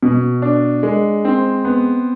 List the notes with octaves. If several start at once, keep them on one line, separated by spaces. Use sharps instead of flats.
B2
D4
G#3
C4
B3